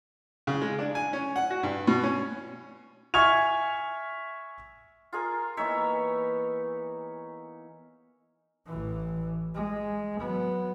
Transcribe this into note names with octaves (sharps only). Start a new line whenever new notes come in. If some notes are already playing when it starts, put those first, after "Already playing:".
C#3
G#3
D4
G#5
C#4
F#5
F#4
G2
B2
C#4
E5 G#5 C#6 F6 G#6 F7
F4 G#4 A#4
E3 A#3 B3 D#4 C#5 E5
A1 E3
G#3
F#3 B3